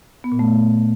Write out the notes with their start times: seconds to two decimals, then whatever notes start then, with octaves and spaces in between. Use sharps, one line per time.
0.24 B3
0.32 A#2
0.39 A3